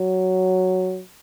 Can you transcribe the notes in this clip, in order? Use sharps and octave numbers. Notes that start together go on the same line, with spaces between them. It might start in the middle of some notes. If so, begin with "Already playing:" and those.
Already playing: F#3